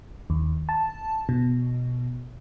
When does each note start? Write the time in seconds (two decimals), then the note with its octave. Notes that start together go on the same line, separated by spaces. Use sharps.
0.30 D#2
0.69 A5
1.29 B2